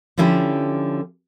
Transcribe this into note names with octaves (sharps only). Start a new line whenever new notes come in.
D3 F3 C#4 E4 G4